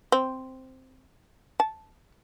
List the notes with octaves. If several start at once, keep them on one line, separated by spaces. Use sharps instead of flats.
C4
A5